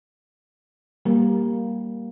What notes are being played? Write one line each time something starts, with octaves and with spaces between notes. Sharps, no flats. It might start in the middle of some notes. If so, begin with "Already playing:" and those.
G3 A#3